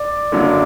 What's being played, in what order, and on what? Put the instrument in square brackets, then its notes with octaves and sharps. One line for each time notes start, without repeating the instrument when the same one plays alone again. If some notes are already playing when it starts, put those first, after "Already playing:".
Already playing: [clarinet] D5
[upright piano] F#1 F#2 D3 F#3 A#3